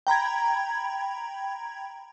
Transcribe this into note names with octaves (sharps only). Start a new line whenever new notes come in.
G5 A#5 B5 G#6